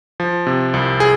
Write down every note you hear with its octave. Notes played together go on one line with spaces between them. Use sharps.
F3
C3
C2
G#4